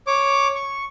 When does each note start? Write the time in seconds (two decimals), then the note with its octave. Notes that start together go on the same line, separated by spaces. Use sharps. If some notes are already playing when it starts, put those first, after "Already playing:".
0.07 C#5 D6
0.55 C#6